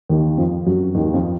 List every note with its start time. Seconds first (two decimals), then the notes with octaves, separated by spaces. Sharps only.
0.09 D#2 D#3
0.37 F2 F3
0.66 F#2 F#3
0.95 D#2 D#3
1.13 F2 F3